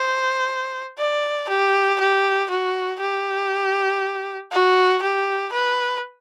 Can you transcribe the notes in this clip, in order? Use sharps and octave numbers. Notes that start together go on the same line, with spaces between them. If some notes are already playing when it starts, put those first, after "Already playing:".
Already playing: C5
D5
G4
G4
F#4
G4
F#4
G4
B4